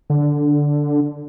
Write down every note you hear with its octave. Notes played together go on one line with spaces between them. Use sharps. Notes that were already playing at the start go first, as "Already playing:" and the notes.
D3